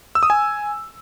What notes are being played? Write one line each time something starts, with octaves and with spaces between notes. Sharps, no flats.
E6
D#6
G#5